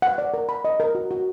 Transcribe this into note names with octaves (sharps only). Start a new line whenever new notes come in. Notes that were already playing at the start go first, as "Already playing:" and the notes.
F#5
D5
A#4
B5
D#5
A#4
F#4
F#4